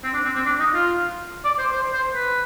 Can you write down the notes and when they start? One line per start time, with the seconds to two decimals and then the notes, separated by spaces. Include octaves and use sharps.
0.04 C4
0.14 D4
0.25 C4
0.35 C4
0.46 D4
0.60 D#4
0.74 F4
1.45 D5
1.59 C5
1.73 C5
1.93 C5
2.15 B4